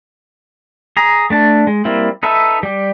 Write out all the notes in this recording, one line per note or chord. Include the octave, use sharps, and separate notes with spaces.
G#4 A#5
A3 D4 A5
G#3
G3 A#3 C4 E4
D#4 A4 B4 E5
G3 G4